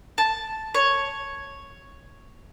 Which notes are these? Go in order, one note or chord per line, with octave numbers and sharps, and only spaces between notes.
A5
C#5